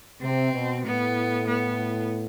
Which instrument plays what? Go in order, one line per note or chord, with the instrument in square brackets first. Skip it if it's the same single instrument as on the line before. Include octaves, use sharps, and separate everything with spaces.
[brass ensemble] C3 [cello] C4
[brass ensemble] B2
[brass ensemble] A2 [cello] B3
[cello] B3